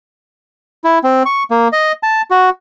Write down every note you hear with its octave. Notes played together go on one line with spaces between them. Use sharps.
E4
C4
C#6
A#3
D#5
A5
F#4